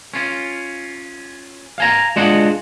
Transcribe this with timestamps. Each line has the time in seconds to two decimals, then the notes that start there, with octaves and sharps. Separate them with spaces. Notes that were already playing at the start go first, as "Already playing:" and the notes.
0.14 C#4 F4
1.78 F5 G#5 A#5
2.16 G#3 D4 F4 F#4 G#4 F#5